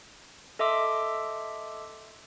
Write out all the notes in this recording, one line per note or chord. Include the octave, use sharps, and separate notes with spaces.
A4 D#5 E5 C6 D6 E6